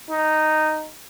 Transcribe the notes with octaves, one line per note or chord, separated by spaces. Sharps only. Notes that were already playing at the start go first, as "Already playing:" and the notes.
D#4